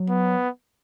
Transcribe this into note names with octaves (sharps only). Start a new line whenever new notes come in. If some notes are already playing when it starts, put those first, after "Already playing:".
Already playing: F#3
B3